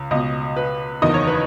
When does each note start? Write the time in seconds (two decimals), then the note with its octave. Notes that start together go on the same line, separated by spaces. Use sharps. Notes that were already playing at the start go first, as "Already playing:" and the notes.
Already playing: C#2
0.11 C#2 B2 D#5
0.56 B4
1.02 F#1 E2 D#3 D#5
1.14 C#5
1.27 B4